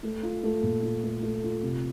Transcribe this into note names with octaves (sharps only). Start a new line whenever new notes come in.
A3
F4
A3
A#2
F4
A3
A3
F4
C3